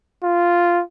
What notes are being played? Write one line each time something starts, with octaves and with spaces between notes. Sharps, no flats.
F4